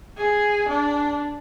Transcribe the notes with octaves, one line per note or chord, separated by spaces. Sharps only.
G#4
D4